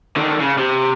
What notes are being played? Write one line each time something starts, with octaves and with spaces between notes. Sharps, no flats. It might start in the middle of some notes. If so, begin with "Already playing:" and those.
D3 D#3
C#3
C3